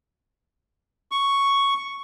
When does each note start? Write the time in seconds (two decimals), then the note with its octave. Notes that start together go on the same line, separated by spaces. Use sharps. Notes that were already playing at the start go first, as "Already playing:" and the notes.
1.12 C#6